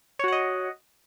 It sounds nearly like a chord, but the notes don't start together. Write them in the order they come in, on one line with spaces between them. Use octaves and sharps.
C#5 F#4 F#5 D#5